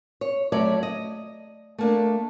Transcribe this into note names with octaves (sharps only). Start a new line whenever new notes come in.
C#5
F#2 F#3 A3 C#5 D5
D#5
A3 A#3 D4